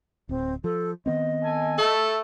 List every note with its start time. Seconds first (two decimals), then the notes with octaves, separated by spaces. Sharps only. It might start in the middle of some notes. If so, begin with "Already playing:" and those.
0.29 D1 C4
0.64 F3 A4
1.06 D#3 B3 C4 D#5
1.43 A4 G#5
1.78 A3 A4